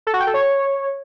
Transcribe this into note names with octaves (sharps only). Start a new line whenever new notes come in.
A4
F#4
G5
A4
C#5